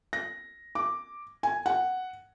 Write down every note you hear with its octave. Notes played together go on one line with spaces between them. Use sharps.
A#6
D6
G#5
F#5